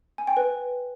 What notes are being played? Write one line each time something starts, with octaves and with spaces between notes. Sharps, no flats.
G#5
G5
B4